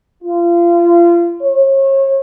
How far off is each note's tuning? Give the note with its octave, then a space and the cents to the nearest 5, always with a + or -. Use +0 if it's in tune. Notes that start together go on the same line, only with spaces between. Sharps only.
F4 -30
C#5 -35